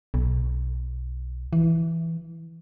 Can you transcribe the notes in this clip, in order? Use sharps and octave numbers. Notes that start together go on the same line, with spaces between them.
B1
E3